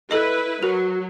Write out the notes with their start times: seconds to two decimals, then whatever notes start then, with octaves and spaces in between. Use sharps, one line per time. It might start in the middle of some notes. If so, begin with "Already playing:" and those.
0.11 E4 A4 B4 D#5
0.63 F#3 F#4 A#4